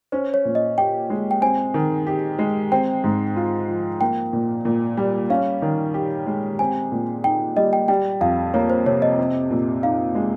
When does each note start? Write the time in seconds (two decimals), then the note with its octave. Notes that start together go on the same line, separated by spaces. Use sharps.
0.12 C#4 C5
0.34 C#5
0.45 A#2
0.55 D#5
0.78 G4 G5
1.10 G#3
1.31 G5
1.42 C4 G#5
1.74 D#3
2.07 G4
2.39 G#3
2.72 C4 G5
3.04 G#2
3.36 F4
3.68 F3
4.01 A#3 G5
4.33 A#2
4.65 A#2
4.97 G3
5.30 C#4 F5
5.62 D#3
5.94 G4
6.27 G#3
6.59 C4 G#5
6.92 A#2
7.24 D#4 G5
7.57 G3 D#5
7.73 G5
7.88 G3 G5
8.21 F2 F5
8.54 A#3 C#5
8.70 C5
8.86 C3 C#5
9.02 D#5
9.18 C4
9.50 A#2
9.83 D#4 F5
10.15 G#3